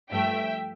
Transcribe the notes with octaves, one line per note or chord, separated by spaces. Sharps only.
G2 F3 A3 E5 G5